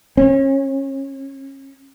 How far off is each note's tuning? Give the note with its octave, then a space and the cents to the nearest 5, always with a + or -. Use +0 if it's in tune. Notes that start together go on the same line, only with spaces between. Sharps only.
C#4 -30